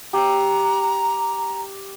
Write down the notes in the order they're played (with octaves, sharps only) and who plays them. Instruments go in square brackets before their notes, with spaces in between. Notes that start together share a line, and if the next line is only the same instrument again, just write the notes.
[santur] G4 [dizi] A#5